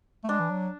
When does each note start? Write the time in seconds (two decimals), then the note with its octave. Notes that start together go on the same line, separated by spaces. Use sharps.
0.24 A3
0.29 G#3 D4
0.40 E3
0.50 F#3